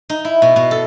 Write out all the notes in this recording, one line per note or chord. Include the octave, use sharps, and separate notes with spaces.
D#4
E4
B2
B2
A4